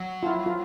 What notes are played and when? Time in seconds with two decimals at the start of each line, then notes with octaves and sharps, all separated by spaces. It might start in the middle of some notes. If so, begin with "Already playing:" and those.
Already playing: F#3
0.23 F4
0.26 E4
0.46 F4